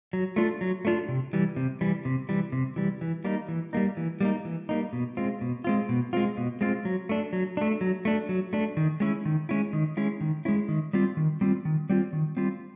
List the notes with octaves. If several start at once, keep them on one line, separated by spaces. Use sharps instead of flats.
F#3
A3 D4 F4
F#3
A3 D4 F4
C3
E3 G3
C3
E3 G3
C3
E3 G3
C3
E3 G3
E3
G3 A#3 D#4
E3
G3 A#3 D#4
E3
G3 A#3 D#4
E3
G3 A#3 D#4
B2
G#3 C4 F4
B2
G#3 C4 F4
B2
G#3 C4 F4
B2
G#3 C4 F4
F#3
A3 D4
F#3
A3 D4
F#3
A3 D4
F#3
A3 D4
D#3
G#3 C#4 E4
D#3
G#3 C#4 E4
D#3
G#3 C#4 E4
D#3
G#3 C#4 E4
D#3
G3 C4 F4
D#3
G3 C4 F4
D#3
G3 C4 F4
D#3
G3 C4 F4